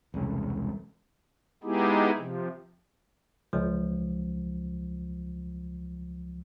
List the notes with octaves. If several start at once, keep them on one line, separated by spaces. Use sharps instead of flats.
E1 C2 C#3 G#3
G#3 B3 D#4 E4 G4 G#4
C3 F3
C#2 F3